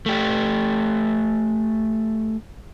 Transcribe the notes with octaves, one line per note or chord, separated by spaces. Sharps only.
A3 G4